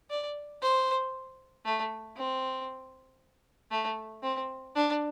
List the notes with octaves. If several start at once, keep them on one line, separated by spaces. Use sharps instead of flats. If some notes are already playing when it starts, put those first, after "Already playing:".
D5
C5
A3
C4
A3
C4
D4